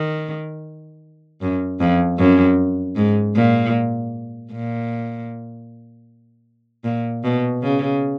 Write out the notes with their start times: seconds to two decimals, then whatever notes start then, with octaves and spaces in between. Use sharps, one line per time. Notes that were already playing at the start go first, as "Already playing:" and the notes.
Already playing: D#3
1.42 F#2
1.80 F2
2.19 F#2
2.96 G#2
3.35 A#2
4.52 A#2
6.84 A#2
7.24 B2
7.63 C#3